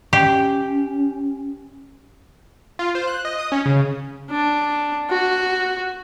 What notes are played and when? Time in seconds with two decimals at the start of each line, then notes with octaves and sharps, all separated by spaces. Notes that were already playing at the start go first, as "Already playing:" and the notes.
0.13 C#4 G4
2.79 F4
2.95 C5
3.07 F#6
3.25 D#5
3.38 D#6
3.52 C#4
3.66 C#3
4.31 D4
5.10 F#4